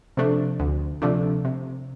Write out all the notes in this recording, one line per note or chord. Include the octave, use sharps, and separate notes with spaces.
C3 F3 A3 D4
D2
C3 F3 A3 D4
C3